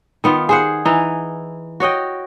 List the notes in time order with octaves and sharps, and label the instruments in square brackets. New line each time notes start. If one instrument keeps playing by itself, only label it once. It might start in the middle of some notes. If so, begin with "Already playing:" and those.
[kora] D#3 B3 F4
G#4 C5 F#5
E3 D#4
F#4 C#5 D#5 G5